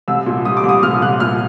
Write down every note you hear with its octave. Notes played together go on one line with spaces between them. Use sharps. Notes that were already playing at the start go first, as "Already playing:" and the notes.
C2 E6
A#2
G3 D#6
D6
C2
D#6
A#2 F6
C2 F#6
A#2 F6